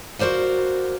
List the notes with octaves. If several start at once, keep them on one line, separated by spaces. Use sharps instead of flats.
F#4 A#4 C5 D5 F5